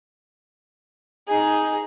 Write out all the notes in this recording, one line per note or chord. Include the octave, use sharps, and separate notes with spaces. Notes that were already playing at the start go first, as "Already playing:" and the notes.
D#4 G#4